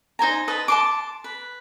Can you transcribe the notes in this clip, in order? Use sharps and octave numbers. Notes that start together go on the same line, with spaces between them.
D#4 C5 G#5 A#5
B4 D#5 A5
A5 C6 D6
B4